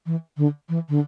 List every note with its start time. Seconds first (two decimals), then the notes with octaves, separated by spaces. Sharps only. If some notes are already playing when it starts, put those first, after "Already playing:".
0.06 E3
0.37 D3
0.69 E3
0.89 D3